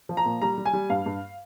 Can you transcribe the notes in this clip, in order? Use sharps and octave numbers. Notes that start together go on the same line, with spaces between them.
F3
A#5
A#2
G3 A#5
G3
G#5
G3
G2 F5
G2